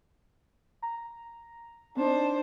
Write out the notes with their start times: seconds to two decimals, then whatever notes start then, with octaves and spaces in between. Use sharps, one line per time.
0.82 A#5
1.97 C4 D4 D#4 C5